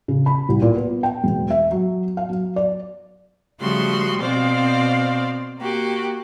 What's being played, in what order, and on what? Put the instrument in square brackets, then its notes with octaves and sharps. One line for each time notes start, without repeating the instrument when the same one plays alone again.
[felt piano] C#3
B5
C2
A#2
B3
G5
E1
E5
F#3
F5
F#3
D5
[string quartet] C#3 F3 G3 A3 F#4 C6
B2 C4 C5 D5 F5
A#3 F#4 G4